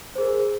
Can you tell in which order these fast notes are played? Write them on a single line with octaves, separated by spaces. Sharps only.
C5 G#4 A#4